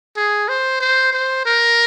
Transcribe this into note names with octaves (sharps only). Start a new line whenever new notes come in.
G#4
C5
C5
C5
A#4